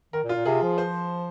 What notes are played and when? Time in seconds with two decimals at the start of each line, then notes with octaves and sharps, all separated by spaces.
0.13 D#3 A#4
0.24 A#2
0.29 F4
0.35 A#2
0.45 C3 G#4
0.62 F3
0.78 C5